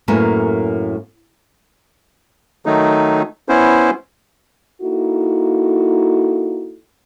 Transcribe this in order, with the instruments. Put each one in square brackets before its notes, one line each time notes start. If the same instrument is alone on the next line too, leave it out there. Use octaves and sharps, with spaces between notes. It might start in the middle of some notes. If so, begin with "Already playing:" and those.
[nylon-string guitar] F#2 A2 A#3 A#4 B4 G#5
[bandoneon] D#3 F#3 A3 D#4
B3 C#4 E4 C5
[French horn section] A#3 D#4 E4 F#4 A4